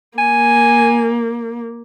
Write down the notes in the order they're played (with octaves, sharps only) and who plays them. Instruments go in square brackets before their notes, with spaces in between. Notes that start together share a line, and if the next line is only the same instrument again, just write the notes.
[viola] A#3 [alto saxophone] G#5